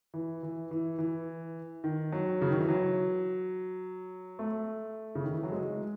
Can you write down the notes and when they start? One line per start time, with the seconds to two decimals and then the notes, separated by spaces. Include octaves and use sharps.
0.14 E3
0.43 E3
0.71 E3
0.99 E3
1.84 D#3
2.12 F#3
2.41 C#3
2.51 D#3
2.61 E3
2.69 F#3
4.39 A3
5.15 C#3
5.24 D#3
5.34 E3
5.43 F#3
5.52 G#3